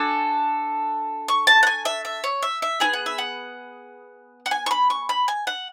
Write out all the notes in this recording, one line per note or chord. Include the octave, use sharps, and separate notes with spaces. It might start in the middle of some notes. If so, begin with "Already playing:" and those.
Already playing: D4 F#4 A4 G#5
C#6
A5
F#5
G#5
E5
E5
C#5
E5
E5
B3 E4 G#4 G#5
F#5
E5
F#5
F#5
G#5
C#6
B5
C#6
B5
G#5
F#5